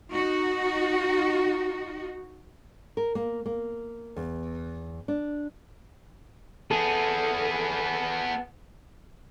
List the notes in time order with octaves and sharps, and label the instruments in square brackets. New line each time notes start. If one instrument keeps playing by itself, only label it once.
[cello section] D#4 F#4
[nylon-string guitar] A#4
A#3
A#3
E2
D4
[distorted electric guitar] B3 G#4 [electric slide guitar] A4